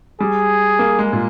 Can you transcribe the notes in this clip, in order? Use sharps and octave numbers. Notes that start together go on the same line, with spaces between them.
G3 G#4
A#3
G#3
A#2